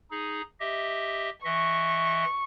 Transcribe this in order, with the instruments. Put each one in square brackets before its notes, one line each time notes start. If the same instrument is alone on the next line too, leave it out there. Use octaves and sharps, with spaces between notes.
[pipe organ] D#4 G#4
G4 D#5 E5
[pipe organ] E3 D#5 E5 [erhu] C#6